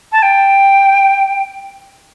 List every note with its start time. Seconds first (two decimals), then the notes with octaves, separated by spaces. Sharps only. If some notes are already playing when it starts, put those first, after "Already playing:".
0.12 A5
0.22 G5